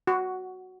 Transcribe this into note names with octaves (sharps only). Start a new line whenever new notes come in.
F#4